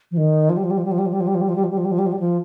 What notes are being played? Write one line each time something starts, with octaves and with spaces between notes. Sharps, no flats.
F3
D#3
F3
G3
F3
G3
F3
G3
F3
G3
F3
G3
F3
G3
F3
G3
F3
G3
F3
G3
F3
G3
F3
G3
F3
G3
F3